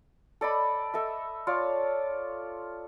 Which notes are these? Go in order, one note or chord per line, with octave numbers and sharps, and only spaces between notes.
A4 D5 D#5 B5
A4 D#5 E5
F4 C#5 D5